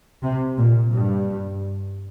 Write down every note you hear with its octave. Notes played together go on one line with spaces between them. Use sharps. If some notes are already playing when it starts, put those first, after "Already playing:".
C3
A#2
G2